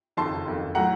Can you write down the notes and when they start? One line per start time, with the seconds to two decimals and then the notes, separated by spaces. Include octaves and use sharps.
0.17 F#1 F2 D#3 A5 C6
0.46 F#1 F2 D#3
0.75 A2 F#3 F#5 A#5